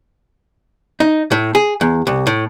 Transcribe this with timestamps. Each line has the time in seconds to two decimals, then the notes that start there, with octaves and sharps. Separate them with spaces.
1.00 D#4
1.32 A2
1.55 G#4
1.81 E2
2.07 C2
2.27 A2